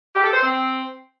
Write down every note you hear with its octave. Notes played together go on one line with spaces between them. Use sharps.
G4
A4
C5
C4